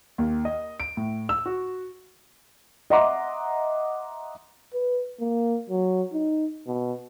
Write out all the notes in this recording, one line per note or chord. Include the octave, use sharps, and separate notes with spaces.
D#2
D#5
D7
A2
E6
F#4
D#5 E5 F#5 A#5 C6 D6
B4
A#3
F#3
D#4
B2